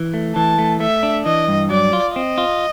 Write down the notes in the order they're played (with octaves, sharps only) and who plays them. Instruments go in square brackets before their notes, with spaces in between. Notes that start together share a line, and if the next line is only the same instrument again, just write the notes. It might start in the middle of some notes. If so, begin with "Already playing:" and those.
Already playing: [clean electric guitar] E3
A3
[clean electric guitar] E3 [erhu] A5
[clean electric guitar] A3
[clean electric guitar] A3 [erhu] E5
[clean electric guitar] D4
[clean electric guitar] E3 [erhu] D#5
[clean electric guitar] G2
[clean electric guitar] F#3 [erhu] D5
[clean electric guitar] F4
[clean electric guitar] C4 [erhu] D#5
[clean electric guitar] F4